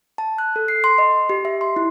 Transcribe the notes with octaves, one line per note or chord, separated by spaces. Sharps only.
A5
F#6
A4
C7
C6
D#5
G4
E5
C6
E4